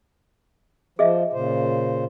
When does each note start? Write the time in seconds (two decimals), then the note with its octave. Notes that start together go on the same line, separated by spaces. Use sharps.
0.99 F3 G#4 D#5 E5
1.33 A#2 C#3 C5